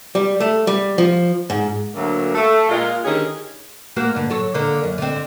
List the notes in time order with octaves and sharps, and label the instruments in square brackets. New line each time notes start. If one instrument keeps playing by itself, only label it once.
[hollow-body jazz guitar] G3
A3
G3
F3
G#2
[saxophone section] D2 F#3 A#3
A3
A#2 G#3 F4
D3 D#3 C#4 D#4 G4 G#4
[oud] A#3 F#4 C5
G2 D3
F#3 A4 C#5
D3 A#3
F#2
D3 C4